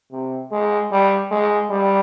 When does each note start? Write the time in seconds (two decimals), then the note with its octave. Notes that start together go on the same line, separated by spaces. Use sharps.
0.12 C3
0.52 G#3
0.92 G3
1.31 G#3
1.71 G3